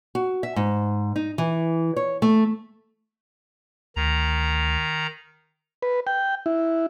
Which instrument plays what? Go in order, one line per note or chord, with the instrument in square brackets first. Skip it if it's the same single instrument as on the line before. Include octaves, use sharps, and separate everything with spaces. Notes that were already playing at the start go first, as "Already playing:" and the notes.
[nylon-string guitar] F#4
E5
G#2
D#4
E3
C#5
A3
[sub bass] D2 [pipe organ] D#3 A#5
[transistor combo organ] B4
G5
E4